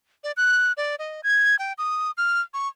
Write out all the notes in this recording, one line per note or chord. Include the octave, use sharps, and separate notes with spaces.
D5
F#6
D5
D#5
G#6
G5
D#6
F6
C#6